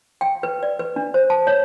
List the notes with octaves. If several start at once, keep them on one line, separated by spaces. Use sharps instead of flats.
G5
B4
D5
B4
D4
C5
A5
C#5